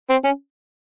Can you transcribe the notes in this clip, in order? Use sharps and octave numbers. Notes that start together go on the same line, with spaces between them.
C4
C#4